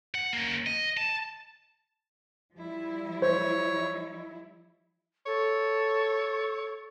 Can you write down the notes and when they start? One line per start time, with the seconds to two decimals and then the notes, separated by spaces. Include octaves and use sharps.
0.15 F#5
0.33 A#3 C#4
0.66 D#5
0.97 A5
2.55 F3 G3 E4
3.22 C5 C#5
5.26 A4 C#5